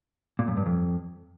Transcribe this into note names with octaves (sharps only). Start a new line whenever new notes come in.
A#2
F#2
G2
F2